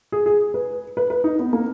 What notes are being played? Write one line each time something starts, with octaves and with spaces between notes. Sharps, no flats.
G#4
G#4
B4
B4
B4
D#4
B3
A#3